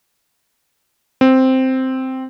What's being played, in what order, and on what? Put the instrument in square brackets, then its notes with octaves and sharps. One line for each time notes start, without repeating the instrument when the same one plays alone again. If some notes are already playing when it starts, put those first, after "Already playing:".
[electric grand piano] C4